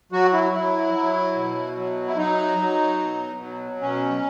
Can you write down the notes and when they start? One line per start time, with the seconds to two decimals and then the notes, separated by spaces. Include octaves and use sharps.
0.12 F#3 F#4
0.33 E4
0.53 F#3 E4
0.94 F#3
1.35 B2
1.76 F#3
2.07 E4
2.17 F#3 D#4
2.58 F#3
3.00 B2
3.41 F#3
3.81 B2 C#4